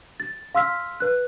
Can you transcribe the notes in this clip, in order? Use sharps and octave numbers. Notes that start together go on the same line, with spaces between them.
A6
F5 C6 E6 F6 B6
B4 F#6